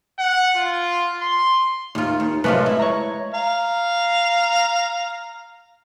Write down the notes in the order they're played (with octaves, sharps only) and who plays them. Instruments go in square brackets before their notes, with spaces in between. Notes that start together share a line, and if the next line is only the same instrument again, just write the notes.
[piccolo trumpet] F#5
F4
C6
[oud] D#2 F4
D#2
[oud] F#2 C3 F4 [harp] G#3 A3 B4
[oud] E4
[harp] C#5 A#5
[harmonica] F5 A#5